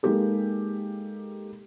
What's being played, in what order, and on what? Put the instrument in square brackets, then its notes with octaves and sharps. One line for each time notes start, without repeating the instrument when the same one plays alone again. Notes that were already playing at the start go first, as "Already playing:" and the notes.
[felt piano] G#3 A#3 D#4 G4 A4